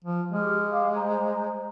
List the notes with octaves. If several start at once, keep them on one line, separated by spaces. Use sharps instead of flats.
F3
G#3 G4 F6
F5 D6
C5 A#5